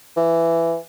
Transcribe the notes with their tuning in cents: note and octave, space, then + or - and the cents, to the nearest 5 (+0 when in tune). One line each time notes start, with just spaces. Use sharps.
E3 +15